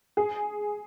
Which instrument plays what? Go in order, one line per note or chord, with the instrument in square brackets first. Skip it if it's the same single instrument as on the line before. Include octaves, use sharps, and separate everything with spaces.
[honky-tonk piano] G#4